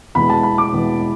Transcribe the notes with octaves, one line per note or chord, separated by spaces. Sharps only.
E2 B2 G#3 B5
A5
B5
D6
E2 B2 G#3